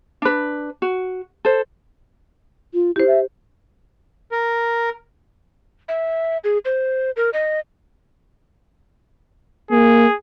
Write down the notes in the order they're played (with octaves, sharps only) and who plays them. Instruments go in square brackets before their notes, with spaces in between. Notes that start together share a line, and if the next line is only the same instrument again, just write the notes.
[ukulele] D4 B4
F#4
A4 C5
[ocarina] F4
[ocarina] E4 [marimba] G4 C5
[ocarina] E5
[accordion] A#4
[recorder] E5
G#4
C5
A#4
D#5
[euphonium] A#3 [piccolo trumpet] G#4